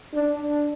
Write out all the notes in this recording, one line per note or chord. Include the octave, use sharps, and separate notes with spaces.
D4